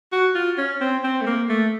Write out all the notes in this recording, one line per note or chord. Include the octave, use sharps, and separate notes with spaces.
F#4
F4
C#4
C4
C4
A3
A#3
A3